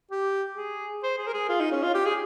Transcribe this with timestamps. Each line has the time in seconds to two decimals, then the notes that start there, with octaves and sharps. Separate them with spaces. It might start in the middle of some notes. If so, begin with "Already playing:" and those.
0.12 G4
0.57 G#4
1.04 C5
1.18 G#4
1.27 A#4
1.34 G#4
1.49 F4
1.60 D#4
1.72 C#4
1.83 F4
1.95 G4
2.06 G#4